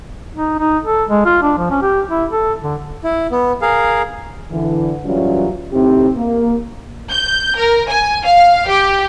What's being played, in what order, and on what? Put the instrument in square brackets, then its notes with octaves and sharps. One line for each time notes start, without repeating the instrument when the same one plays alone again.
[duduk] D#4
D#4
A4
G#3
F4
D4
F3
C#4
G4
E4
A4
D3
[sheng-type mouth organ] E4
B3
G#4 A#4 F5
[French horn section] D3 E3
F#2 E3 F#3 G3 C#4 F4
A2 C3 C4 D#4 G4
A#3
[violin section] G6
A#4
G#5
F5
G4